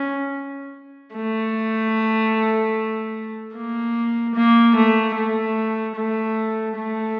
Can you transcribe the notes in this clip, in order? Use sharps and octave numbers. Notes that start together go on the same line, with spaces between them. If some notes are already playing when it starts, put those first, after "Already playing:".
Already playing: C#4
A3
A#3
A#3
A3
A3
A3
A3